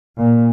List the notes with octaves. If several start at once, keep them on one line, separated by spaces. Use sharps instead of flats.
A#2